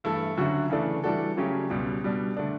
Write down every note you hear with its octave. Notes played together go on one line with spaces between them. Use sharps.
G2 E3 A3 E4 A4
D2 D3 F#3 C#4 F#4
C#3 E3 A3 D4 A4
E3 G3 D4 F#4 A4
C#3 F#3 A3 C#4 G4
C#2 B2 G3
B2 G3 D4
D3 A3 D4